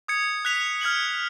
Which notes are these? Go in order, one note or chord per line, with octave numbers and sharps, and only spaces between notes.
D#6 G#6 C#7
F#6 B6 F7
F6 G#6 C#7 F#7